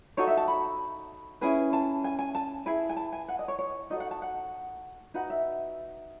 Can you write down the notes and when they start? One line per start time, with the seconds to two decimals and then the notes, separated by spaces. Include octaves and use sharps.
0.17 D#4 F#4 A4 C#5
0.27 E5
0.37 A5
0.48 B5
1.41 C#4 E4 G#4 B4
1.73 A5
2.04 G#5
2.19 G#5
2.35 A5
2.66 E4 G#4 B4
2.89 G#5
2.97 A5
3.12 G#5
3.28 F#5
3.39 D#5
3.48 C#5
3.59 C#5
3.90 D#4 F#4 A4 D#5
4.00 F#5
4.11 A5
4.22 F#5
5.14 D#4 F#4 B4 F#5
5.30 E5